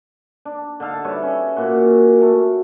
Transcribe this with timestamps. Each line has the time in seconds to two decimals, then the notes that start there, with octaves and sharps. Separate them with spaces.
0.45 D4
0.80 D3 D#4 A4 F5
1.04 G3 B4 C#5 E5
1.23 C#4
1.56 A#2 A#3 F#4
2.22 A3